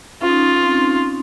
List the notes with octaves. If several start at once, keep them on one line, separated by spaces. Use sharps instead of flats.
C#4 F4
D#4
C#4
C4